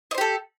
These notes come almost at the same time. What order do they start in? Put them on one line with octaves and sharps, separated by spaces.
D#5 C5 G4 A4